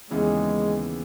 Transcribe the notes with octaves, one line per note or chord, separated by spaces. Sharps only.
D#2 C#3 E3 G#3 B3